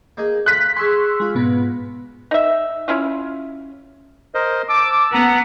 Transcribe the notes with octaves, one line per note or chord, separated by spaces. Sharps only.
A#3 D#4 G#4
F4 A#5 F#6 B6
G#4 G#5 C6 C#6 E6
G#3 F4
G#2 B2 B3
D#4 E5
C#4 E4 F4
A#4 C5 D#5
A5 D6 E6
B3 F#5 A#5